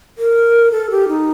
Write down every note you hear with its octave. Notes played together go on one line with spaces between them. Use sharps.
A#4
A4
G4
D#4